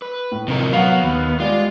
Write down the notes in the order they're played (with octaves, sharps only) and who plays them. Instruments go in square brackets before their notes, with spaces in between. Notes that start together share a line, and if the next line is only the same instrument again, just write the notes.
[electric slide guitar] B4
[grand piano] A2
[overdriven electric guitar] C3 A#4 [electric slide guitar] D#3 F3 D#4
[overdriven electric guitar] F#3 [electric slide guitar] B3 [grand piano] F5 F#5
[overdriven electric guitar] D#2
[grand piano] G3 D5 [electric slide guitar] G#3 [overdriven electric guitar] F4